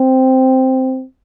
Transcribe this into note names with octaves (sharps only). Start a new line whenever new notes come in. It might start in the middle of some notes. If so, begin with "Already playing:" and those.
Already playing: C4